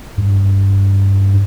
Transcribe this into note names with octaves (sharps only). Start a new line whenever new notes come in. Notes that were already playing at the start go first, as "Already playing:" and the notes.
G2